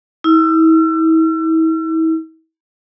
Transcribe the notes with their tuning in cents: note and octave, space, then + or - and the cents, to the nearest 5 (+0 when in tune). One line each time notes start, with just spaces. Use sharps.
E4 -40 E6 +40